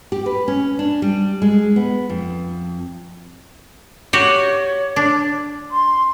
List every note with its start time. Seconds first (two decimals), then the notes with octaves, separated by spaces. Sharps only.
0.12 G4
0.26 B4
0.48 C#4
0.79 D4
1.02 G3
1.42 G#3
1.76 B3
2.10 F2
4.13 F#4 G4 C#5
4.96 D4
5.71 C6